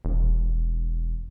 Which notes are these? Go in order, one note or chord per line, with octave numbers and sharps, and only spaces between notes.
E1